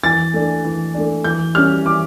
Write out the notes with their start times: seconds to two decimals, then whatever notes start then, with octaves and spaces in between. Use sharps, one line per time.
0.03 E3 A6
0.34 A3 D4
0.64 E3
0.94 A3 D4
1.24 E3 G6
1.55 G3 C#4 F6
1.85 E3 D6